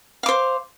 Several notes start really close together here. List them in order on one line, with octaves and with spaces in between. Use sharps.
F5 D6 C5